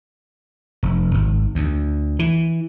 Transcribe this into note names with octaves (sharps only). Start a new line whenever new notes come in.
F1
G#1
D2
E3